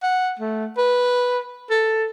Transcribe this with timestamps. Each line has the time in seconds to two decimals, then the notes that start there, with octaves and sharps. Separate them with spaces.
0.02 F#5
0.39 A3
0.77 B4
1.70 A4